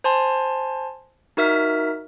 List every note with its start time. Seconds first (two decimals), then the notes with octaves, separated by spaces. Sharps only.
0.04 C5 G#5 A5 C6
1.37 D#4 F#4 A#4 E5 F6 B6